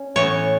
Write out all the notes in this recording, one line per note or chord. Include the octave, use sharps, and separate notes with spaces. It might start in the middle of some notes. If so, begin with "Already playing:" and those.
Already playing: C#4
A2 E3 B3 C#5